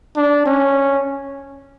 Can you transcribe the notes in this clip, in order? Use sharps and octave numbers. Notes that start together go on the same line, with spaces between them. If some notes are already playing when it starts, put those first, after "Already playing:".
D4
C#4